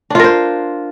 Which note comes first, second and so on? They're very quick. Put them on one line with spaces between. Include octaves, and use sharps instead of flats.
D4 F4 A#4 C5